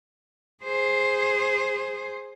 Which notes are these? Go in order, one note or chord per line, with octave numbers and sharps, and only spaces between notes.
G#4 C5